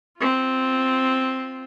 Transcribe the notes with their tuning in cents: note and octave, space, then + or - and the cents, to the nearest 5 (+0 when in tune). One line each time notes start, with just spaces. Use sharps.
C4 +0 F4 +5